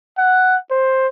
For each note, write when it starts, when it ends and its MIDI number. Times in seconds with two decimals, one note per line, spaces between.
0.18 0.56 78
0.71 1.08 72